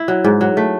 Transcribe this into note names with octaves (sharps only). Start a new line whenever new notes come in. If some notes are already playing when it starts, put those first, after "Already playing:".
Already playing: E4
F#3
G#2
F#3
A3